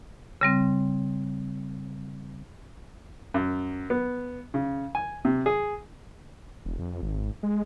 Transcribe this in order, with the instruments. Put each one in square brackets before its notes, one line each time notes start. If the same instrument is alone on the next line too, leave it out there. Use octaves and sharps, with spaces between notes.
[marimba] C#3 G3 C4
[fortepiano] F#2
B3
C#3
G#5
C3
G#4
[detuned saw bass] E1
F2
G#1
G#3